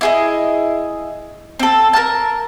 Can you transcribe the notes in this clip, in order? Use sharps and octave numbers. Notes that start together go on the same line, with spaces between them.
E4 G#4 D#5
C4 A4
A#4 A5